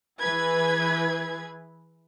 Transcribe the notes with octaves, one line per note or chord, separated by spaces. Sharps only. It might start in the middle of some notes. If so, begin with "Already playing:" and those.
E3 E4 G#4 B4 G#6